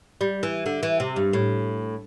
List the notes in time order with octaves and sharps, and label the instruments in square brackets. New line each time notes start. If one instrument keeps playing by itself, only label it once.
[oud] G3
E3
D3
E3
C3
G2
A2